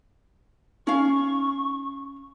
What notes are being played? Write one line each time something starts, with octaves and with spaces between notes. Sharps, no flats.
C#4 D#4 F5 C#6